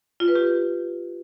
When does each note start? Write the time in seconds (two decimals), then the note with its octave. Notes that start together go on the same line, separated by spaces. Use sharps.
0.20 F4
0.28 B4
0.35 G4